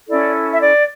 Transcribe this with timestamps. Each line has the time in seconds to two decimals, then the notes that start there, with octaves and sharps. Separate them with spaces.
0.08 C#4 E4 A4 D5
0.52 E5
0.60 D5